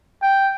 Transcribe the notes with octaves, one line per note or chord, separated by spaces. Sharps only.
G5